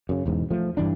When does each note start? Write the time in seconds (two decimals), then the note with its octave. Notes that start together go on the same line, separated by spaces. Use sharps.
0.09 F#2 C#3
0.26 E1 E2 G#2
0.51 F3 A3
0.77 G2 E3 D4